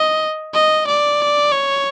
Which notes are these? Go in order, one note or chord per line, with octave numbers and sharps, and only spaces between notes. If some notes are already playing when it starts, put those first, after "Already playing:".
Already playing: D#5
D#5
D5
C#5